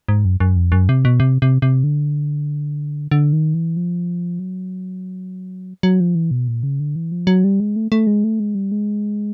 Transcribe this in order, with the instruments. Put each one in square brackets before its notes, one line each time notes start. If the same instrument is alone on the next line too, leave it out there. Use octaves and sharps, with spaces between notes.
[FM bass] G#2
F#2
F#2
F2
F#2
C3
B2
C3
C3
C3
D3
D3
D#3
E3
F3
F#3
F#3
F3
E3
B2
A#2
C#3
D3
E3
F3
F#3
G3
G#3
A3
A3
G#3
A3
G#3
G3
G#3